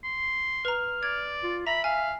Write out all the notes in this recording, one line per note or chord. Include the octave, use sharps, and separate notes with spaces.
C6
B4 A#5 F6
D5 G#6
F4
E5 A#5 B5 A#6
F5 G#5